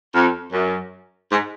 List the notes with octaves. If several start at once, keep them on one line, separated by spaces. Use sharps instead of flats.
F2
F#2
G#2